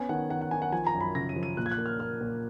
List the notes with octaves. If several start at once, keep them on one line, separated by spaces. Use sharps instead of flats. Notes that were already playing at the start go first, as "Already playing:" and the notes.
Already playing: B3 C#4 G#5
D#3 F#5
D#3 F#5
F#5
D#3 G#5
F#5
F3 G#5
A#5
F#2
B5
C#3 A#6
D#7
F3
D#7
A#2 F#6
G#6
F#6
A#3
F6
A#3 F6
A#2